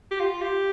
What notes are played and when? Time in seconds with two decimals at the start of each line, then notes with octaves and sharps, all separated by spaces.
0.11 G4
0.20 F4
0.41 G4